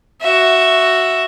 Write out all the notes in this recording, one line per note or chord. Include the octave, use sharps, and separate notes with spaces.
F#4 E5